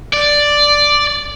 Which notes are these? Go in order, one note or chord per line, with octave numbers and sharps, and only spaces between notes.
D5